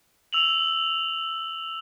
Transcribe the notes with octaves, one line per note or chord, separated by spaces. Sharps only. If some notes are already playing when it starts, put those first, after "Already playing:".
E6 F7 F#7